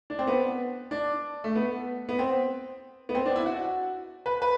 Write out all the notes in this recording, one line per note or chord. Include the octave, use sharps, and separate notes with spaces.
D4
C4
B3
D4
A3
B3
B3
C4
B3
C4
D4
E4
F#4
B4
B4